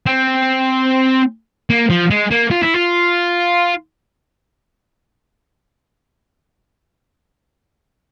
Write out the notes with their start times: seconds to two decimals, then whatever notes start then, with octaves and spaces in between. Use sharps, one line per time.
0.06 C4
1.70 A#3
1.90 F3
2.10 G#3
2.31 A#3
2.51 F4
2.62 E4
2.74 F4